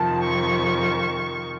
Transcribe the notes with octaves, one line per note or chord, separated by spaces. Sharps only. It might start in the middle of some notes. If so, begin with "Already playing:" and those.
Already playing: F2 C3 D#3 A5
C#6